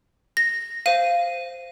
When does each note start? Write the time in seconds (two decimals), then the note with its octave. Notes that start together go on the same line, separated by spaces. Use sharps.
0.37 A#6
0.86 C5 F5 D#7